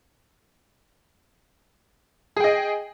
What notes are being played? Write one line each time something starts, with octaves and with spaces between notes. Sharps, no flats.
G#4 D#5 G5